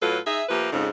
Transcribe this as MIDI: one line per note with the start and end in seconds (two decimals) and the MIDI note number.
0.02 0.19 45
0.02 0.19 54
0.02 0.19 65
0.02 0.19 69
0.02 0.19 71
0.27 0.43 63
0.27 0.43 68
0.27 0.43 76
0.49 0.71 53
0.49 0.71 57
0.49 0.71 58
0.49 0.71 67
0.49 0.71 71
0.73 0.89 41
0.73 0.89 44
0.73 0.89 49
0.73 0.89 56
0.73 0.89 63